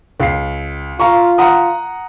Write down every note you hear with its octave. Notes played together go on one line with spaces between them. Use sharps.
C#2 C7
F4 F5 A#5 C#6
F#5 A#5 D#6